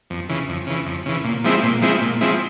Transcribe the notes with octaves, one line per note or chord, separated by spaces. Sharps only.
F2
C#3 E3
F2
C#3 E3
F2
C#3 E3
A#2
F3 G#3 C4 E4
A#2
F3 G#3 C4 E4
A#2
F3 G#3 C4 E4